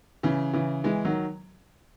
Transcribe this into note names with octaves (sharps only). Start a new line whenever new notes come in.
C#3 E3
C#3 E3
E3 G#3
D#3 F#3